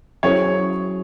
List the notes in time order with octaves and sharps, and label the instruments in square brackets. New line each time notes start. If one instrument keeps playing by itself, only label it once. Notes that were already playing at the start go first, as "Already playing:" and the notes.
[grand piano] F#3 C#4 E4 G#4 C5 [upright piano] C#5